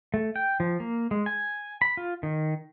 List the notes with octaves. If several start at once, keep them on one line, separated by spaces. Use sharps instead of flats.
A3
G5
F3
A#3
G#3
G#5
B5
F4
D#3